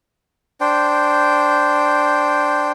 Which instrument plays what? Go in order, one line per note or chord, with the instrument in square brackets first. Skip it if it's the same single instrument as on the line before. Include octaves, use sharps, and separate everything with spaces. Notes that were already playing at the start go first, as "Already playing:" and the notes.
[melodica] D4 C5 G5